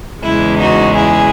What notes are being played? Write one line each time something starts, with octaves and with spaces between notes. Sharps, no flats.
E2 C#3 G#3 E4
D#4 F#4
E4 G#4